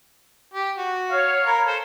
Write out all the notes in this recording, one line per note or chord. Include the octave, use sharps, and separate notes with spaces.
G4
F#4
C#5 F5
A#4 B5
A4 C5